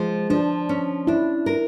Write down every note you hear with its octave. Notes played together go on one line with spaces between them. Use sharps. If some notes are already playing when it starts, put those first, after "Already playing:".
Already playing: F3 G#3
F3 D4
C#4
D4 E4
A#4